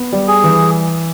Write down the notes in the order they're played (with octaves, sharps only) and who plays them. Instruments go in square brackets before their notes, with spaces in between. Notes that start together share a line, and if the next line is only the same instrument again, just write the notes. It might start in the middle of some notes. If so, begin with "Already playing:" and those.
Already playing: [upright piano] B3
G3
[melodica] G#4
[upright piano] E3